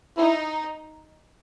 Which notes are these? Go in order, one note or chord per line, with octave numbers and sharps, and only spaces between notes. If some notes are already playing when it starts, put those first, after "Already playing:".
D#4 E4